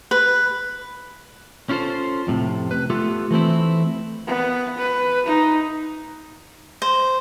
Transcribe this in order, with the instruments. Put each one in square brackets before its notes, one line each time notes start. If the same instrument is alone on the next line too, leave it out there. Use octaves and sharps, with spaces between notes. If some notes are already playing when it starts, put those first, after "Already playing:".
[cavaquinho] B4
[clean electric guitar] C#4 E4 F4 A4 C5
F2 A2 C3
B4
A3 B3 F4 G4 A4
E3 A3 C4 E4
[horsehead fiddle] B3
B4
D#4
[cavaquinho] C5